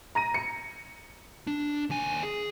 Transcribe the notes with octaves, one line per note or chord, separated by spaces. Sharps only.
A#5 A#6 D#7
C#7
D4
D#2 G#5
G#4